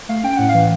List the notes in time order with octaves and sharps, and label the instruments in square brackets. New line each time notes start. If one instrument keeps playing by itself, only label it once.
[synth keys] A3 F5
C#4 G5
A2 F#5
F5
E3